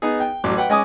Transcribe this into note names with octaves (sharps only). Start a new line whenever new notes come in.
B3 D#4 G#4
G5
A1 A2 F#3 D6
B4 F#5 G5
G#3 C#4 D#5 G#5 D6 D#6